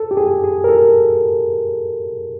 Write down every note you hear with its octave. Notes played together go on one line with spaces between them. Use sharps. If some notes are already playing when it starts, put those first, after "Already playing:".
Already playing: A4
G4
G#4
G#4
A#4
A4